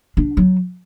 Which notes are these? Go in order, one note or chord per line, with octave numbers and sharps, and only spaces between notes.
D4
F#3